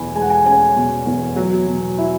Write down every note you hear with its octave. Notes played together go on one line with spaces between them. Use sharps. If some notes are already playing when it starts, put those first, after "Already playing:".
Already playing: E2 B2 G#5 B5
G#3 G#5
F#5
G#5
C#4 G#5
B2
E2
F#3
B2
E4